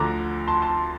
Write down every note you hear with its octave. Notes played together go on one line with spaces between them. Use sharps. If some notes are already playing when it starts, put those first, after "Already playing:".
Already playing: D2 D3 F3 A#5 D6
A5 C6
A5 C6